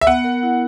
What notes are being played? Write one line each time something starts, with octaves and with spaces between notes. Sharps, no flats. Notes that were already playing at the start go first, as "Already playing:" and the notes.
E5
B3 F#5
A#4
E4